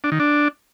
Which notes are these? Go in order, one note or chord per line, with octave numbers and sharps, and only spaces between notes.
D4
D#3
D4